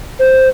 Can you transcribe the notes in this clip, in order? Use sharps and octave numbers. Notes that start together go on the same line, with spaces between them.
C5